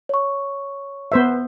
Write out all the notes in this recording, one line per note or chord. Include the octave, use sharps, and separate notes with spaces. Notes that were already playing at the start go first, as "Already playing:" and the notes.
C#5 C#6
B3 C5 E5